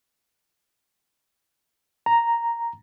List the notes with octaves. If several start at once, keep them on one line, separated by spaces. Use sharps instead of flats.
A#5